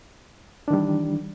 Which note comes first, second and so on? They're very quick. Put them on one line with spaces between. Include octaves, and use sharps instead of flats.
D4 D#3 G3 E3